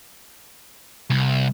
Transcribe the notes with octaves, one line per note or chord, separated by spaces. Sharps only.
C2